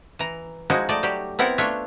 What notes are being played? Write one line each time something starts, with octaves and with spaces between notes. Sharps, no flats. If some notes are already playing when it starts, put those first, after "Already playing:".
E3 A#5
F3 G#3 D#4 E4 F#4
A3 D#4 D5
F#3 G3 G4
B3 C4 E4 A#4 F#5
A3 D4 F4 C#5 E5